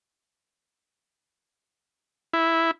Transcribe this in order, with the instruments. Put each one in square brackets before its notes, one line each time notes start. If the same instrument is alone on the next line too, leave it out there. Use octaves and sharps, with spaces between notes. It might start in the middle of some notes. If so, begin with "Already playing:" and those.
[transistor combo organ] E4